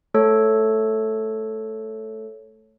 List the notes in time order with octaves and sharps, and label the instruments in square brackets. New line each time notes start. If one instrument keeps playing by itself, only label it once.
[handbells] A3 A4 C#5